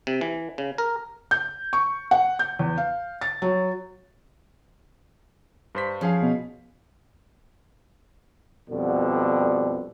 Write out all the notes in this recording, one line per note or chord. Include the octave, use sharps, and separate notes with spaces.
C3
E3
C#3
A#4
G6
C#6
F#5
G6
E2
F5
A6
F#3
G2 C5 B6
F3 C#4 G#4 F5
B2
F2 B2 D3 G3